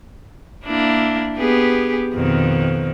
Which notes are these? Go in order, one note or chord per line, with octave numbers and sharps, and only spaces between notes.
A#3 D4 E4
B3 G4 G#4
F2 B2 D#3